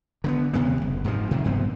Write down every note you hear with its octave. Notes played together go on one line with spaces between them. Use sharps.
D3 A#3 B3
D#2 C3 G#3 B3
F#1
G#2 C3 D#3 F3
C3 D#3 F#3
A#1 G2 B3 C4